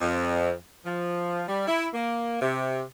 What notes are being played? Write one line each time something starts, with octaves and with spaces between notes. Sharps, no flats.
F2
F3
G3
E4
A#3
C3